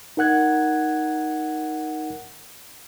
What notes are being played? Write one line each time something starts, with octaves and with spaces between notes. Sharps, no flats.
D#4 A#4 F#5 F#6 G#6